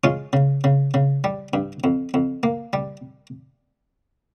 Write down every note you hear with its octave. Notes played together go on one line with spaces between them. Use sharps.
G#3 C#4 F4
C#3
C#3
C#3
G3
G2
F2
F2
A#3
G3